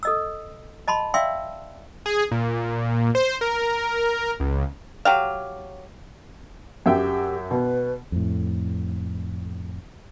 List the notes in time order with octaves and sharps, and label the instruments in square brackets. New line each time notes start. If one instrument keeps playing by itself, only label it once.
[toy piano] A4 D#5 E6
D#5 A5 B5 C6
D5 E5 F5 G5 C6 E6
[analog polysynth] G#4
A#2
C5
A#4
C#2
[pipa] F#3 G4 F5
[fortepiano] F#2 E5 G5 [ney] G4
[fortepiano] B2 [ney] B4
[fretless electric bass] F2 A2